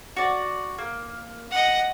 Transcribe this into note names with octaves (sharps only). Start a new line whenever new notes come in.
F#4 D5
A#3
D#5 F#5